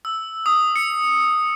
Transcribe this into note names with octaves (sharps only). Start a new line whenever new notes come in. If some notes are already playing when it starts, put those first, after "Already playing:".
E6
D#6
C#7